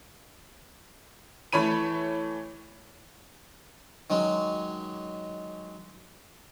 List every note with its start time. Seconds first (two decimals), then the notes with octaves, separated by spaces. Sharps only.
1.53 E3 A3 C#5 B5 D#7
4.10 D#3 F#3 G#3 C#4